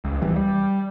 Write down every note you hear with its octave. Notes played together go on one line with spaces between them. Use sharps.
C#2
D1 E3 G3
G3